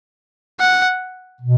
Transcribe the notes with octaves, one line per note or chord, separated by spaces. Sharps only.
F#5
B2